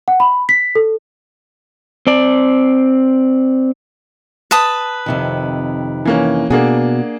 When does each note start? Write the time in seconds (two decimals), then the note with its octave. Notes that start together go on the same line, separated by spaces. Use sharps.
0.08 F#5
0.20 B5
0.49 B6
0.75 A4
2.07 C4 D5
4.51 B4 A5 D#6
5.06 F2 C3 D#3
6.05 E3 A#3 C#4
6.50 B2 A#3 D4 F#4 G#4